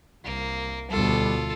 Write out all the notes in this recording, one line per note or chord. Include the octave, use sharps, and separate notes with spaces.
C2 A#3
D2 B2 G3 F4 A4